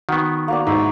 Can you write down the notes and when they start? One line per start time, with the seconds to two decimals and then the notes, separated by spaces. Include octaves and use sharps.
0.09 D#3 B3 F#4
0.48 A#3 F#4 D5
0.67 G#2 D#4 E4 E5